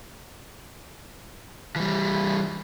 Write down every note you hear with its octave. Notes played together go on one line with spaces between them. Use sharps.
E3 G3